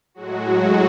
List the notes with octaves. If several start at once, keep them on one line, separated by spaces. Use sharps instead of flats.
A2 F#3 G#3 F#4